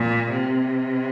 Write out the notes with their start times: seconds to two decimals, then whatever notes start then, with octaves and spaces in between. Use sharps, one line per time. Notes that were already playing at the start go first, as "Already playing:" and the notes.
Already playing: A#2
0.31 C3